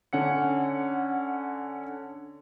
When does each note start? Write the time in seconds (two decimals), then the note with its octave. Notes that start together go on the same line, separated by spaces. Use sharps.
0.13 D3 C#4 F#5 C#7